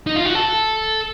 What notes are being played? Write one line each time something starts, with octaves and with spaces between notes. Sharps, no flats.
D#4
F4
F#4
A4